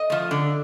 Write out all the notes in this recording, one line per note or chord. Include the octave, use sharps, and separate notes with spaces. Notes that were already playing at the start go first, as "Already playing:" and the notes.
Already playing: D#5
F3 A3
D3